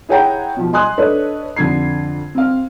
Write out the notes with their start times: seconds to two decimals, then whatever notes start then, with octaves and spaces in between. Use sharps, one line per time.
0.09 E4 G#4 C#5 F#5 G5 A#5
0.57 B2 F3
0.73 D#5 G#5 C6 D#6 F#6
0.98 D4 A4 B4 C#5 D#5
1.56 F2 D3 G#6 C7
2.35 C4 F5